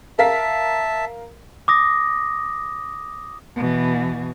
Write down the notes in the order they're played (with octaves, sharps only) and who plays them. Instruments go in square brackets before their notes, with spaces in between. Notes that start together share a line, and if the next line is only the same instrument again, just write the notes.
[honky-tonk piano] A#4 F5 B6 [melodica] E5 A5
[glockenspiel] D6 D#6 A#6
[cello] B2 E3